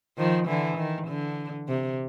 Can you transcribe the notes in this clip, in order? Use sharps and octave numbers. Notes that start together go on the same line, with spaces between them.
D#3 F3
D3 E3
D#3
D3
C3